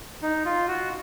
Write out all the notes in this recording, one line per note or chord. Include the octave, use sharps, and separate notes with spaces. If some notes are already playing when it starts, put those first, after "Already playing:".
D#4
F4
F#4